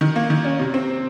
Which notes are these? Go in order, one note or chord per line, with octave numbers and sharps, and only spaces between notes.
D#3
A#3
D#3
C#4
C3
C4